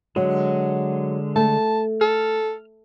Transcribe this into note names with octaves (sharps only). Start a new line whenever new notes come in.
D3 F#3 G#3
A3 A5
A4 F6